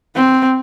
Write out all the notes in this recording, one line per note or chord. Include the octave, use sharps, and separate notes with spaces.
C4